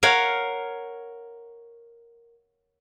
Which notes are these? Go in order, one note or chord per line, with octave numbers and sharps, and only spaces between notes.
A#4 C#5 F5 F#5